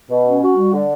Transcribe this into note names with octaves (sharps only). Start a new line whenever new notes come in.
B2
C#4
F#4
G3
D3